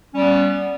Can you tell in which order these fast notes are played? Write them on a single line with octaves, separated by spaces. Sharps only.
C#4 G3 B3